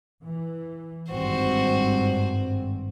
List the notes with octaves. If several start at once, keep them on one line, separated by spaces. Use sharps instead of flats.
E3
G#1 G2 C4 F#4 C5